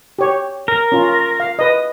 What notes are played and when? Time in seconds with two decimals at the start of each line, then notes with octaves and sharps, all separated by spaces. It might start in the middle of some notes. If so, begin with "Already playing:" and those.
0.19 G4 C#5
0.68 A#4
0.92 C#4 F4
1.40 F5
1.59 B4 D#5